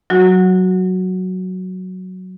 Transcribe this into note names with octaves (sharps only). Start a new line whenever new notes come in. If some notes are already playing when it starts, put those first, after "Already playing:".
F#3 F#4